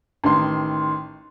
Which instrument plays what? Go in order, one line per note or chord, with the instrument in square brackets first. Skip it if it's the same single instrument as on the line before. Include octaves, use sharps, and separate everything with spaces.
[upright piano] A1 D#3 C6